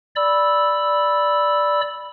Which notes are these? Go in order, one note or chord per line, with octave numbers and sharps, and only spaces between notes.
D5 B5 E6